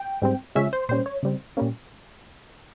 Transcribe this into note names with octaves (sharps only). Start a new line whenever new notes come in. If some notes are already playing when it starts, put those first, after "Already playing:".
Already playing: G5
G#2 G3 C4
C#3 F3 G#3 C#4 E5
C5
A#2 G3 C#4 C5
C#5
C#3 G3 C4
A#2 G3 A#3 C#4